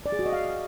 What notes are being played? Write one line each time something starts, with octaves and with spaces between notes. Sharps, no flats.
D5
G#4
F#4
D#5
F5